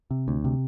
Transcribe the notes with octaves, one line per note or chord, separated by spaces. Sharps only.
C3
D2
C3